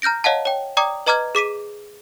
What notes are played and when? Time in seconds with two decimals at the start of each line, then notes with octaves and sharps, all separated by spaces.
0.02 A#5 F6 G6 A#6 D7
0.24 C#5 D#5 F5 F#5 A5
0.45 C#5 G5
0.77 D5 G5 A#5 D6 D#6
1.06 B4 D#5 A#5 D6 F6 G#6
1.35 G#4 D6 B6 D#7